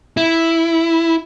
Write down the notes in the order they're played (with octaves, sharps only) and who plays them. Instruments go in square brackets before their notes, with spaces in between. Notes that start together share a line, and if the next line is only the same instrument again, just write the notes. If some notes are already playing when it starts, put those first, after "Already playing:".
[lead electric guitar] E4